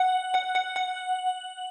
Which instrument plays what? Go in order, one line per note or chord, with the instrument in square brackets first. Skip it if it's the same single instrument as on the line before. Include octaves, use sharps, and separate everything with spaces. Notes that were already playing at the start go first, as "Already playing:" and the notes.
Already playing: [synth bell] F#5
F#5
F#5
F#5